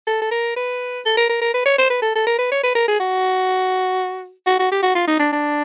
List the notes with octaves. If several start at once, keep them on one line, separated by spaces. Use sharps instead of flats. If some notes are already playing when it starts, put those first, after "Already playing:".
A4
A4
A#4
B4
A4
A#4
A#4
A#4
B4
C#5
C5
B4
A4
A4
A#4
B4
C#5
B4
A#4
G#4
F#4
F#4
F#4
G4
F#4
F4
D#4
D4
D4